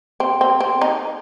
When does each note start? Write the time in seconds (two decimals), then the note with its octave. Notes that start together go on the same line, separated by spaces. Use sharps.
0.20 C4
0.41 C4
0.60 C4
0.81 D#4